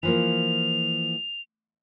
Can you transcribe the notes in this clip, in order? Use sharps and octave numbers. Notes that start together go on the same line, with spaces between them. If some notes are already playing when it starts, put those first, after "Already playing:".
E3 F3 A#3 F7